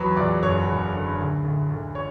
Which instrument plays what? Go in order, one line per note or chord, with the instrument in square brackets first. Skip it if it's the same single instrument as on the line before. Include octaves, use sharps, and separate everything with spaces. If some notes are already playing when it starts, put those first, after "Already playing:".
Already playing: [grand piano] E2 F#3 B4 B5
E2 D5 D6
F#1 C#5 C#6
F#1
D3
D2
D2
D2
C#5 C#6